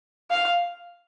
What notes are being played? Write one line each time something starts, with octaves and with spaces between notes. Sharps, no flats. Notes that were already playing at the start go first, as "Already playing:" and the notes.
F5